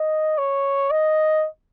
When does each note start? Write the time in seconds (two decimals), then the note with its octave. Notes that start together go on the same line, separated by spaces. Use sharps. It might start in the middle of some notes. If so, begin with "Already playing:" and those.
Already playing: D#5
0.38 C#5
0.91 D#5